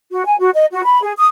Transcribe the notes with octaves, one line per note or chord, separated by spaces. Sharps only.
F#4
G#5
F#4
D#5
F#4
B5
G#4
D#6